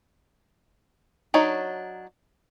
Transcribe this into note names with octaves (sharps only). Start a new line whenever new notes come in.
F#3 D4 D#4 C#5 D5